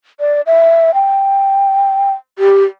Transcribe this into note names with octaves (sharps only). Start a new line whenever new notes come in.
D5
E5
G5
G4